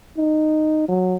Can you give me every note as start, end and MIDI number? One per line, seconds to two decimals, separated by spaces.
0.18 0.86 63
0.88 1.16 54